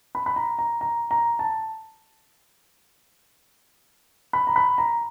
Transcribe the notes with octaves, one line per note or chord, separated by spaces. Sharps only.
B5
B5
A#5
A#5
A#5
A#5
A5
B5
A#5
B5
A#5